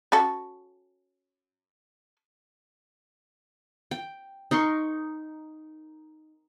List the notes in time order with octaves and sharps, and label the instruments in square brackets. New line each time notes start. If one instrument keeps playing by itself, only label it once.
[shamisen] C#4 F#4 A4
[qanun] G5
D#4 A#4 C6 C#6